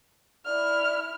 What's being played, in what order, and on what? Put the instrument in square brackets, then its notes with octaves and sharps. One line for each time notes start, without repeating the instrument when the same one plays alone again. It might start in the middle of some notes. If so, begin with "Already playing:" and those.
[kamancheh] E4 F6 [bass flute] D5